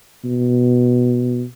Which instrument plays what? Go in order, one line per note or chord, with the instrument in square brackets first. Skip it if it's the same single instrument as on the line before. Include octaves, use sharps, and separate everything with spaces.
[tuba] B2